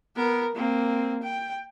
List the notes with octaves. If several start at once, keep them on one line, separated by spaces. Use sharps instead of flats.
B3 A#4
A#3 C4
G5